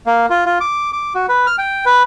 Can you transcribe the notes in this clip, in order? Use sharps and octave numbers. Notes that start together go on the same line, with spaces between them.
A#3
F4
F4
D6
D6
F#4
B4
F6
G5
B4